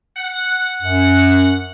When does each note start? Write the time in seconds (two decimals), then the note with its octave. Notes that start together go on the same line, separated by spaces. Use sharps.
0.17 F#5
0.82 F#2